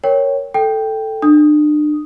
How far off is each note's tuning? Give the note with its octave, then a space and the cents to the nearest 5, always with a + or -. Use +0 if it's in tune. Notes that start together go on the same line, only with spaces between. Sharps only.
A#4 +0 C#5 +0 G5 +0
A4 +0 G5 +0
D4 +35 D#6 +0